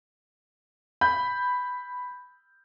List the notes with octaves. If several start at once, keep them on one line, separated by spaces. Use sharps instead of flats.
B5 G6